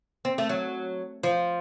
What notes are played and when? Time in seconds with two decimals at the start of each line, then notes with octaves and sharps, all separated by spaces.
0.25 C4
0.38 A3
0.49 F#3
1.23 F3